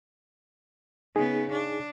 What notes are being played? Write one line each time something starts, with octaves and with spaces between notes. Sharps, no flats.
C#3 B3 D#4 G#4
D4